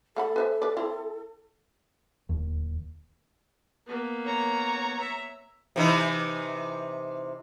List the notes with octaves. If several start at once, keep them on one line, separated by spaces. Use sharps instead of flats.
A3 A4 F#5 B5
B4 C5 E5
B4 D5
C4 E4
D1 D#2
A#3 B3
C#5 A#5
E5
C3 E3 D#4